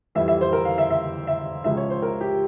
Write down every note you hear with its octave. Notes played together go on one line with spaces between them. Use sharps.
F2 E3 G3 E5
E5
C5
A#4
F5
E5
E5
E5
C#2 C#3 F3 E5
C#5
C5
A#4
G4